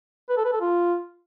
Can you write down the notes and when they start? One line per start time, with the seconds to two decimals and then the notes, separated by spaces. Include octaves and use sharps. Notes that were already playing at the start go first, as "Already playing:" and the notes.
0.29 B4
0.37 A4
0.45 B4
0.53 A4
0.61 F4